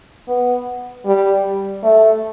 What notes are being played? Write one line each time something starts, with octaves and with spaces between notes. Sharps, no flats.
B3
G3
A3